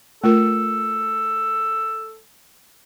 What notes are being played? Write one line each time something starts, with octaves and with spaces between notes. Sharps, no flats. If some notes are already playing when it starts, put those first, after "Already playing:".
A3 F4 A4 A#4